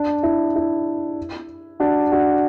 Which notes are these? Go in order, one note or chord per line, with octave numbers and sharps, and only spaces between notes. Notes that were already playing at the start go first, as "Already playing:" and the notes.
Already playing: D4
E4
E4
D4 F#4
D4 F#4